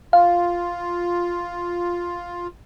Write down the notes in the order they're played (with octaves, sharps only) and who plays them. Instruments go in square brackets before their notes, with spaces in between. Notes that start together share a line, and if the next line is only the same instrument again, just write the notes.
[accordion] F4 [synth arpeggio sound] F5